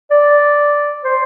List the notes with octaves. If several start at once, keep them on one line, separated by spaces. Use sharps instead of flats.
D5
C5